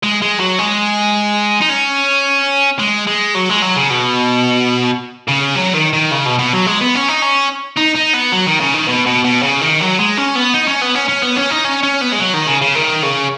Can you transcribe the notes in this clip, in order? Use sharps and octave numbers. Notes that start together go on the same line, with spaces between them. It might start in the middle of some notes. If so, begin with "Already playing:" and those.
G#3
G#3
F#3
G#3
D#4
C#4
G#3
G#3
F#3
G#3
F#3
C#3
B2
C#3
F#3
D#3
D#3
C#3
B2
B2
F#3
G#3
B3
C#4
D#4
C#4
D#4
D#4
B3
F#3
D#3
C#3
D#3
B2
B2
B2
C#3
D#3
F#3
G#3
C#4
B3
D#4
C#4
B3
C#4
C#4
B3
C#4
D#4
C#4
C#4
B3
G#3
F#3
D#3
C#3
C#3
D#3
C#3